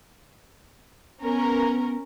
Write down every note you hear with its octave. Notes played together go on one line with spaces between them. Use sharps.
B3 C#4 A#4